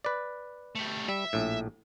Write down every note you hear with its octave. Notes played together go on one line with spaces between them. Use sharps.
B4 D5
G3 A3
G3 E5
A#1 A2